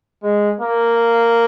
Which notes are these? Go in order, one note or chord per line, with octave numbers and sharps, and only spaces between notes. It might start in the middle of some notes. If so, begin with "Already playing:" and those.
G#3
A#3